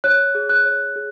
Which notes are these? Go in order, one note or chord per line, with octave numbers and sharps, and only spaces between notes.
C#5 F#6
G#4
F#6
C#5
G#4